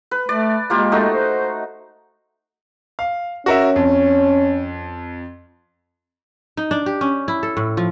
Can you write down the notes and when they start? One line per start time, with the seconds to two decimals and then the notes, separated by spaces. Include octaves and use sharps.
0.11 B4
0.29 A3 D5
0.70 G#3 A#3 F4 G4
0.92 A3 D#4 F#4
1.13 C5
2.99 F5
3.46 C#4 F#4 A#4 E5
3.76 F2
6.57 D#4
6.71 D4
6.86 G4
7.01 C#4
7.28 E4
7.43 A4
7.57 A2
7.77 F3